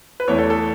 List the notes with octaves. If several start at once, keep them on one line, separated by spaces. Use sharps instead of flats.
B4
E2 E3 A3 C#5
A4
A4